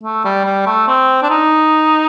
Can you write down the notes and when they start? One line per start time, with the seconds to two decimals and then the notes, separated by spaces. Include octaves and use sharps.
0.03 A3
0.25 G3
0.45 G3
0.66 A3
0.87 C4
1.22 D4
1.30 D#4